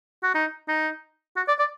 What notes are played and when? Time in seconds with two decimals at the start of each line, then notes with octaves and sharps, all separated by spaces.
0.23 F#4
0.35 D#4
0.68 D#4
1.36 F#4
1.48 D5
1.59 D5